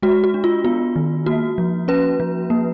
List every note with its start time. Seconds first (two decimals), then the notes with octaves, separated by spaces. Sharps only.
0.03 G#3 F#4
0.24 F#4
0.34 D4
0.44 F4
0.64 B3 F4
0.96 D#3
1.26 A#3 F#4
1.58 F3
1.88 C#4 B4
2.20 F3
2.50 A#3